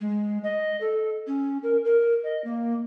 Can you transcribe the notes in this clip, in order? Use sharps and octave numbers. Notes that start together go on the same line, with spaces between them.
G#3
D#5
A4
C#4
A#4
A#4
D#5
A#3